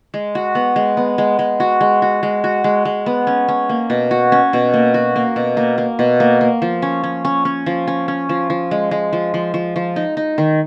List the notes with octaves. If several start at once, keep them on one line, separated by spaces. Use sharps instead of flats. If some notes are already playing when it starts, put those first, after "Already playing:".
G#3
F#4
B3
G#3
B3
G#3
G#3
F#4
G#3
F#4
G#3
F#4
G#3
G#3
B3
C#4
C#4
A#3
B2
F#4
C#4
B2
A#3
F#4
A#3
B2
A#3
A#3
B2
A#3
A#3
F3
C#4
C#4
C#4
C#4
F3
C#4
C#4
F3
F3
G#3
G#3
F3
F3
F3
F3
D#4
D#4
D#3